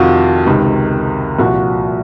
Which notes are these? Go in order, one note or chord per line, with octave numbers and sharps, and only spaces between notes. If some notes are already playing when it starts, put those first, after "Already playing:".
Already playing: F2 C3 D#3 F4 F#4
C#2 C3 D#3
C2 A#2 F3 F#4